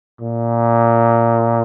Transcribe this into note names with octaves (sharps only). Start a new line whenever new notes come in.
A#2